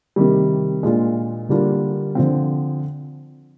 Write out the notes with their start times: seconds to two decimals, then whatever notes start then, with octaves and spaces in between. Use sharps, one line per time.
0.16 C3 D#3 G3
0.83 A#2 G#3 D4 F4
1.49 D3 G3 A#3 D4 F4
2.15 D3 F3 C4